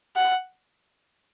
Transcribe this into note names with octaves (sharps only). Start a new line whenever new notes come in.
F#5